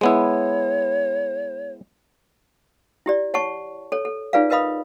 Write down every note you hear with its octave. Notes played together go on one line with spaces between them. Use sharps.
G#3 B3 E4 C#5
E4 G4 D5
C#5 F#5 A5 C#6
A4 C#5
A4
D#4 F4 G#4 B4 D5 F5
A#4 B4 D#5 F5 B5 D#6